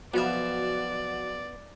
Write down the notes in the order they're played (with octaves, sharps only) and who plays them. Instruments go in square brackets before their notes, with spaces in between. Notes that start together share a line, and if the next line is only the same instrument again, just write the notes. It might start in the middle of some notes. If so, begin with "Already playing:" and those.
[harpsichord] B1 F3 E5 [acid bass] B3 [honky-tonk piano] F#4 [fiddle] D5